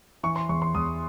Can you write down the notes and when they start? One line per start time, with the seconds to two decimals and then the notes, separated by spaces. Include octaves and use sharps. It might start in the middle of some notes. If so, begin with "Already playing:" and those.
0.23 E3 C#6
0.36 C6
0.49 E2 C#6
0.62 C6
0.75 E2 D#6